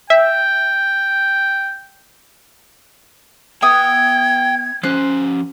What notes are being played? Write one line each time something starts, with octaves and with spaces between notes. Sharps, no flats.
E5 G5
B3 E5 G5 D#6 G#6
F3 C#4 C5 F#6